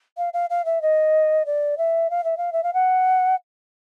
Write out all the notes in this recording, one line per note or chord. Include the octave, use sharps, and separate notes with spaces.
F5
F5
F5
E5
D#5
D5
E5
F5
E5
F5
E5
F5
F#5